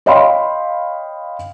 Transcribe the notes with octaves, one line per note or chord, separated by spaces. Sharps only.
C#5 D#5 F5 G5 B5 C6